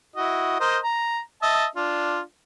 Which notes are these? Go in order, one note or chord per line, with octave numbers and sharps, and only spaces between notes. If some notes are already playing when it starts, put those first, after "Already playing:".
E4 F#4 D#5
A#4 C5 D#5
A#5
D#5 E5 A5
D4 F4